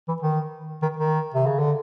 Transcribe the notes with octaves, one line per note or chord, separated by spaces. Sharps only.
E3
D#3
D#3
D#3
C3
C#3
D3